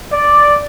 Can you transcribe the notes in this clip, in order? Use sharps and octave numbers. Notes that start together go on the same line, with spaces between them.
D5